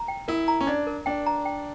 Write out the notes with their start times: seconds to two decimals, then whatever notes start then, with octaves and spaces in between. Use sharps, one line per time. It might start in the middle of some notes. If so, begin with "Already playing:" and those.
Already playing: A#5
0.08 G5
0.28 E4 A#4
0.48 A#5
0.61 C#4
0.67 D4 D5
0.87 A#4
1.06 D4 G5
1.26 A#5
1.45 G5